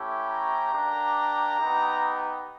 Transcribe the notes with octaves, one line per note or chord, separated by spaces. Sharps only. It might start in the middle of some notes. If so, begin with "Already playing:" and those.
Already playing: A3 C#4 E4 G4
A#5
A#3 D4 G4
B3 D#4 G4